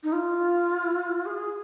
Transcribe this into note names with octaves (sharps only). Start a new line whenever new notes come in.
D#4
F4
G#4